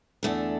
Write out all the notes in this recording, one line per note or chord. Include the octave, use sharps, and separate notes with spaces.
E2 D3 A3 D4